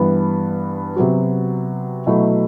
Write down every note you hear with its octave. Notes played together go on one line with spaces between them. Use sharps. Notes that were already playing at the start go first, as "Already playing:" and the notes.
Already playing: G2 E3 B3
C3 F#3 B3 F#4
B2 F#3 A3 E4